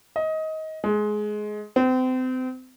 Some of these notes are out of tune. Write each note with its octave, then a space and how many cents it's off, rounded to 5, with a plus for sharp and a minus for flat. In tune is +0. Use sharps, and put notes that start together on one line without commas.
D#5 +20
G#3 +20
C4 -35